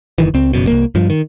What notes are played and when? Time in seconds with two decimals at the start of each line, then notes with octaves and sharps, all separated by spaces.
0.18 F#1 D#3 E3
0.34 C#2 C4
0.53 F#1 F#2 B2
0.67 C2 F2 A#3
0.95 G2 F3
1.10 D#3